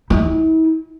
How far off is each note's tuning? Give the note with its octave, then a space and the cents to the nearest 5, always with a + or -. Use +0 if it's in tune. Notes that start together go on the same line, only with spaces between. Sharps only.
E4 -45